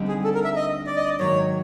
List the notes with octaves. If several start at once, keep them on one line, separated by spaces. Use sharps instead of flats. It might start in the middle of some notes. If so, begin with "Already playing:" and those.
Already playing: D2 D3 G3 C4 D#4
G#4
A4
A#4
E5
D#5
D5
D#5
D5
G#2 D#3 F#3 A#3 C#5